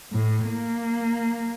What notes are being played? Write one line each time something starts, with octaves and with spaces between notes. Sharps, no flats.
A2
A#3